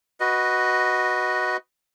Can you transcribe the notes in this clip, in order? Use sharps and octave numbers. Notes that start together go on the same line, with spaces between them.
F#4 B4 D#5